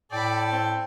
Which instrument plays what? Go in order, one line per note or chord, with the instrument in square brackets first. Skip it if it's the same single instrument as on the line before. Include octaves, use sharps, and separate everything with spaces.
[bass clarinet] A2 [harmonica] A4 [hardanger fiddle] D5 B5 [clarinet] G5
[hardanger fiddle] C4